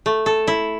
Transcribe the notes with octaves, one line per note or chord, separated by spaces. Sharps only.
A3
A4
E4